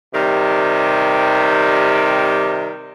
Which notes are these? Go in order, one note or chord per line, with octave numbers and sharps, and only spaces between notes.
C3 D#3 G3